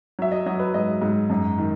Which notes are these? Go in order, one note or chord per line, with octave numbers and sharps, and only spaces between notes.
F#3 E5
D#5
F#3 D#5
B4
G#2 D#5
G#2
F#2
D#3